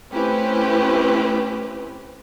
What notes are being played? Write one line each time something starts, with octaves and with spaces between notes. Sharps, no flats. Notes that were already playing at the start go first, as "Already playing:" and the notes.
A3 C4 C#4 E4 G4 B4